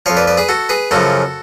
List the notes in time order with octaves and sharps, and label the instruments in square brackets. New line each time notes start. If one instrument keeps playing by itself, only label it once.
[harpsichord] F2 F3 C#5 F5
B4 D5
B4 D5
G#4 B4
F#4 A4
G#4 B4
F#2 C#3 F3 F#4 A4